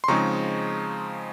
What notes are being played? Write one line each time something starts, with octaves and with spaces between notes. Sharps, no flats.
C6
C#3 F3 G#3 C4 D#4 A#5 C#6